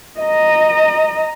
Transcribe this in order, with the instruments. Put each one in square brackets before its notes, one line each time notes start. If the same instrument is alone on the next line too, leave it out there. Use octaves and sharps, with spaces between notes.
[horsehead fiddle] D#5 A#5